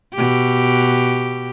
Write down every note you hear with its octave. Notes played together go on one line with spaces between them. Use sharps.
B2 G4